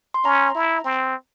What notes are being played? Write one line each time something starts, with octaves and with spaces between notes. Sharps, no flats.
C6
C#4 A#5
E4
C4